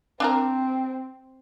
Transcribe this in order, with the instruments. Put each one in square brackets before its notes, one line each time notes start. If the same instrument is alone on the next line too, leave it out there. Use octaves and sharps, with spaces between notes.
[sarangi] C4 [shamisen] D4 E4 A#4